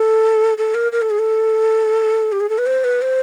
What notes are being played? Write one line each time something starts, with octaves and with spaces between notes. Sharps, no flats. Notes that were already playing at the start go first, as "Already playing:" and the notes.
Already playing: A4
A4
A#4
A#4
A4
G#4
A4
G4
G#4
A4
B4
C5
B4
C5